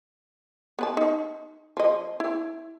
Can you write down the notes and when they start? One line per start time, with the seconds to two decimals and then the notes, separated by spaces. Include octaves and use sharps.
0.79 B3 B4 A5
0.97 D#4
1.77 F3 D#5
2.20 E4